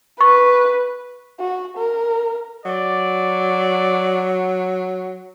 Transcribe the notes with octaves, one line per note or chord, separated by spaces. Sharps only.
B4 C#6
F#4
A#4
F#3 D5